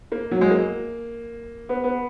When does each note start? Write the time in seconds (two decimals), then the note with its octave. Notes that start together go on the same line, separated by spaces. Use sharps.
0.12 A#3
0.31 F#3
0.41 G#3
0.51 A#3
1.69 B3
1.84 B3